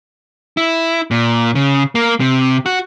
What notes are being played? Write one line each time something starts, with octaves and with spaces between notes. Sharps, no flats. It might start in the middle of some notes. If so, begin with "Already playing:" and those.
E4
A#2
C#3
A#3
C3
F#4